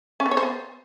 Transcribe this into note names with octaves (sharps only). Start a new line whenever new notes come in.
C#4
B3
C#5
C5
B3